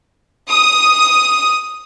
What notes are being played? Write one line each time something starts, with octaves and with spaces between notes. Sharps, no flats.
D#6